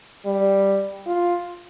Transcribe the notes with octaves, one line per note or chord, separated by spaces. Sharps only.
G3
F4